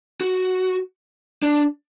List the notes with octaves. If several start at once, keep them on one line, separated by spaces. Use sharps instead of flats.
F#4
D4